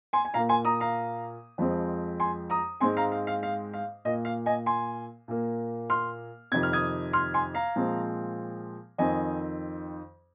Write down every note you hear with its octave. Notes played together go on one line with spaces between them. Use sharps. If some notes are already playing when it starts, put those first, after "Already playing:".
G#5 C6
G#5
A#2 A#3 F5 A#5
G#5 C6
A#5 D#6
F5 A#5
F2 F3 G#3 C4
G#5 C6
A#5 D#6
G#2 G#3 C4 G#5 C6
F5 A#5
F5
F5
F5
F5
A#2 A#3 D#5
F5
D#5 G#5
G#5 C6
A#2 A#3
C6 F6
F2 C3 D#3 C4 G#6
F6
D#6 G#6
C6 F6
G#5 C6
F5 A#5
A#2 F3 G#3 C4
F2 D#3 C4 D#5 G#5